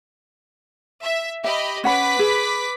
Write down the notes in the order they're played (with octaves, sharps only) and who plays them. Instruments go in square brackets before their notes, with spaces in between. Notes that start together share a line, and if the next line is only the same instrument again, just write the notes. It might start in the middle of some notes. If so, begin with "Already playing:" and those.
[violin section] E5
[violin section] G4 D#5 B5 [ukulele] E5
[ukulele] C#4 F#5 B5 [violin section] B4 D6 B6
[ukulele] G#4